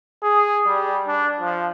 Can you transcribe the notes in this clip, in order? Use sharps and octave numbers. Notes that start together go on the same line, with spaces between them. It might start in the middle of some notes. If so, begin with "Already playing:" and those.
G#4
G3
D4
F3